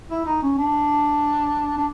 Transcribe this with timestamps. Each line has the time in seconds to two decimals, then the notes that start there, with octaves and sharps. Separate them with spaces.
0.10 E4
0.26 D#4
0.42 C#4
0.58 D4
1.77 D4